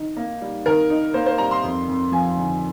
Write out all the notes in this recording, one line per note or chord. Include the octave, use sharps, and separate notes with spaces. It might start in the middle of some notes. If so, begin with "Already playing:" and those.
Already playing: D#3 D#4
A#3
G3
D#3 A#4
D#4
A#3 C5
C5
G3 A#5
C6
F2
F2
F3 G#5
D3